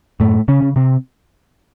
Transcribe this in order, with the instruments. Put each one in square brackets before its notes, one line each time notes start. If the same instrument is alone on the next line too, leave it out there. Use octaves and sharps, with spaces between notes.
[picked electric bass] F#2 A2 A3
C#3 C#4
C#3
C3 C4